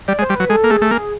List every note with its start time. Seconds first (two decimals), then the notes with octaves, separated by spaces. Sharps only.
0.08 G3 D5
0.19 G#3
0.22 C5
0.29 G3
0.36 F#3 B4
0.49 G#3 A4
0.64 A#3
0.70 A3 G#4
0.82 A3
0.91 A#3 G#4